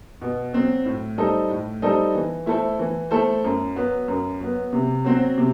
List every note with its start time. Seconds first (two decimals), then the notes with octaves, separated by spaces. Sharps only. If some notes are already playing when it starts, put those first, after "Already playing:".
0.21 B2
0.53 F#3 C4
0.85 A2
1.17 G3 D#4 A4 C5
1.50 A2
1.82 G3 D#4 A4 C5
2.15 E3
2.46 A3 E4 A4 C5
2.79 E3
3.11 A3 E4 A4 C5
3.44 F#2
3.76 F#3 B3
4.08 F#2
4.41 F#3 B3
4.73 C3
5.05 F#3 C4 F#4 C5
5.38 C3